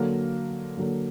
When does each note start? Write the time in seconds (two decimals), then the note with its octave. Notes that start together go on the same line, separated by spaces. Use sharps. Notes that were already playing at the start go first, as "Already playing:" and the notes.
Already playing: D3 F#3 A#3
0.77 D3 F#3 A#3